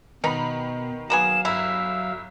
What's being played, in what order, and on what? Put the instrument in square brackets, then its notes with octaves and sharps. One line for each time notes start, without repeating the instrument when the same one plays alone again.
[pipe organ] B2 [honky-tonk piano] D#3 A#5 B5 [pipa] B3 D#4
[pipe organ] F#3 F5 [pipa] A#3 B3 G#4 [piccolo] E7
[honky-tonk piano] G1 E5 A#5 [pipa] E4 [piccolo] E6